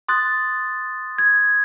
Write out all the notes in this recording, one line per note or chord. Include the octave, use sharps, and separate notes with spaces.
C6 D#6 F#6 A6
G#6